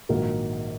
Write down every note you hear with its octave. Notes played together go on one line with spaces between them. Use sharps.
A#1 G#2 D#3 F#3 A#3